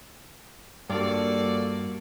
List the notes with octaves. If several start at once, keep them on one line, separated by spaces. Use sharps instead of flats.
G2 A#3 F4 F#4 A4 D5